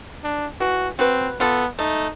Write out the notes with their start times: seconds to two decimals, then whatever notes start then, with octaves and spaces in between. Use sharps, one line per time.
0.24 D4
0.60 E3 F#4
0.99 C4 F#4 B4
1.40 B3 F4 A4
1.79 A3 D#4